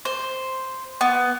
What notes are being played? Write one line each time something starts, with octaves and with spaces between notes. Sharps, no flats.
C5
B3